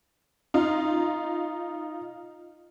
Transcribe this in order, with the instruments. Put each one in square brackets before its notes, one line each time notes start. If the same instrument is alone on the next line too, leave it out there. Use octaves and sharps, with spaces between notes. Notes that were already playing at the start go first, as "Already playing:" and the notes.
[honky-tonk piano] D#4 F4